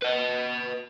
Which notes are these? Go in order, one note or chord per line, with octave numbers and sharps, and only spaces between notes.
B4 D#5